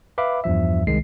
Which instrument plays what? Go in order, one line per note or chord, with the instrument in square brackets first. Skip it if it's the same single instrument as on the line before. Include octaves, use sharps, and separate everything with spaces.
[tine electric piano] B4 E5 F5 B5 D6
E2 G2 F3 E5
C2 D#3 G#3 C7